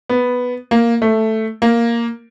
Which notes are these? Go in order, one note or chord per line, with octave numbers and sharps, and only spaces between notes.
B3
A#3
A3
A#3